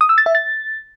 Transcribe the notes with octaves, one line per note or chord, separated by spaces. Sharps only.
D#6
E6
A6
E5
A6